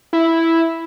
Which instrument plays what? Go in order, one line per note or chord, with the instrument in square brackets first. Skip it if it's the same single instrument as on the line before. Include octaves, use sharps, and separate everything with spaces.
[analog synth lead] E4